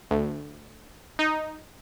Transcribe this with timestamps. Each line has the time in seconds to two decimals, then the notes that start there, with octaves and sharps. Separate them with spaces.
0.11 D2
1.19 D#4